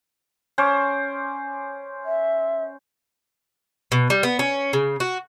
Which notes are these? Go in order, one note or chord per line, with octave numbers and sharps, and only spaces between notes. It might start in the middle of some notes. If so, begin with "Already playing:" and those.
C#4 C5 D5
E5
B2
G3
B3
C#4
C#3
F#4